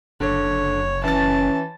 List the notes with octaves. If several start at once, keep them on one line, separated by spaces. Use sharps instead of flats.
F#1 D3 C#5
E3 C#4 A5 A6